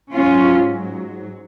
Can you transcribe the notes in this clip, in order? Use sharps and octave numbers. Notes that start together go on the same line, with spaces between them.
G#2 F#3 C#4 F4